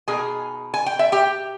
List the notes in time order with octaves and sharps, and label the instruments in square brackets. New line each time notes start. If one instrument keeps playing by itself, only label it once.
[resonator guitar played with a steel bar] B2 A#3 D#4 G#4 G#5
G#5
G5
E5
G4 G5